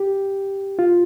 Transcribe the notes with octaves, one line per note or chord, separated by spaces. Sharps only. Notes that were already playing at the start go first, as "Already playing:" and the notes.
Already playing: G4
F4